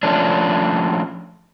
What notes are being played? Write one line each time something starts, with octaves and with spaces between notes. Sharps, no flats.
F3 A3 C#4 D4